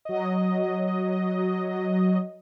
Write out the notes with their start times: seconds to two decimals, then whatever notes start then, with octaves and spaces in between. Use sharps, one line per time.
0.05 F#3 D#5